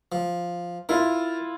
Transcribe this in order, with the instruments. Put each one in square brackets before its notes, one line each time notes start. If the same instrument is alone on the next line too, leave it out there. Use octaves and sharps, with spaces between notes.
[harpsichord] F3
[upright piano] E4 F4 [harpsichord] A#4